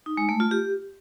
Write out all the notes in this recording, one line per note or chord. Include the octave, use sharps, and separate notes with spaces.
D#4
G#3
A3
F4
G4